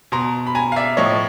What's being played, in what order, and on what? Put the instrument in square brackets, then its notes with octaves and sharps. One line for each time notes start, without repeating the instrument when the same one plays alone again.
[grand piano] B2 A#5 C6
B5
G#5 A#5
F5
D5 E5
A2 F3 C#5 D#5